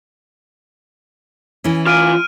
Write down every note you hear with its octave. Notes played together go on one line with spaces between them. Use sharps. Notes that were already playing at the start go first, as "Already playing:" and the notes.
E3 C#4
F4 G#5 F6 D7 D#7